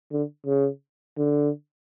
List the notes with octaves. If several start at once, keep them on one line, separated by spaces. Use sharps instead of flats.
D3
C#3
D3